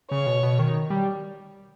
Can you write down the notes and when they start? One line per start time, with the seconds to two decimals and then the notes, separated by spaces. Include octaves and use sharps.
0.10 C#3 C#5
0.26 B2
0.43 B2
0.59 D#3
0.90 G3